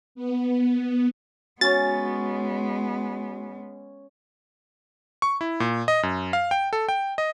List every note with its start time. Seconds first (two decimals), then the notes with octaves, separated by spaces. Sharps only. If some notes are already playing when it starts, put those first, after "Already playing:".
0.15 B3
1.61 G#3 B3 C#4 F#4 C#5 A6
5.22 C#6
5.41 E4
5.60 A#2
5.88 D#5
6.03 F#2
6.33 F5
6.51 G5
6.73 A4
6.89 G5
7.18 D#5